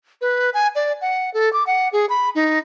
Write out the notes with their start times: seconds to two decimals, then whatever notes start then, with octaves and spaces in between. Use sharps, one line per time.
0.21 B4
0.54 G#5
0.75 D5
1.01 F#5
1.34 A4
1.53 D6
1.67 F#5
1.93 G#4
2.09 B5
2.35 D#4